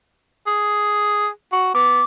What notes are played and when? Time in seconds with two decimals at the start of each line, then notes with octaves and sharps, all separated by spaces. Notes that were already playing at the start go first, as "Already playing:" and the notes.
0.47 G#4
1.52 F#4
1.75 B3 D6